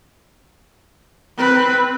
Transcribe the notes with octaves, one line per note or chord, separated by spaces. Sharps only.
C4 B4